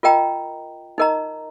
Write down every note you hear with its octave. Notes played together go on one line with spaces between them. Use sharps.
F4 A#4 D#5 G5 A#5
D#4 A#4 D#5 A#5